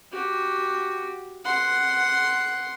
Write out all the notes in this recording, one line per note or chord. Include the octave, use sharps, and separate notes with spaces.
F#4 G4
F#5 C6